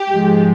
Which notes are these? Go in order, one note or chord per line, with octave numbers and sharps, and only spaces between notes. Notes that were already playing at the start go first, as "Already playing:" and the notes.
Already playing: G4
G#2 F3 G#3